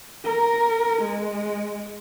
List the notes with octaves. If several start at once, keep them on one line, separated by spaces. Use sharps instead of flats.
A#4
G#3